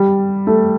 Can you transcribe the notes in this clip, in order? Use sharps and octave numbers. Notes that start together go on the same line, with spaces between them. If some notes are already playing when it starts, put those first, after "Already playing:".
Already playing: G3
A3